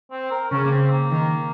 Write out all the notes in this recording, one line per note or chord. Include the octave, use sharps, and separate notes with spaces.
C4
A#4
C#3 C#4
A#3
C4
A#3
D#3